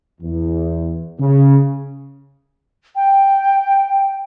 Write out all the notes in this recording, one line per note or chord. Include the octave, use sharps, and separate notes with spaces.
E2
C#3
G5